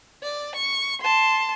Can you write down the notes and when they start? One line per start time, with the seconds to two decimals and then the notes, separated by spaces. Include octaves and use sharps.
0.23 D5
0.56 C#6
1.02 A5 C6